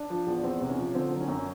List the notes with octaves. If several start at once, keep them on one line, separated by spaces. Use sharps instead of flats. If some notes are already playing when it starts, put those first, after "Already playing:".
Already playing: D4
F3
E2
E2 C4
C3
C#4
F3
D3 C4
F#3
C#4
F#2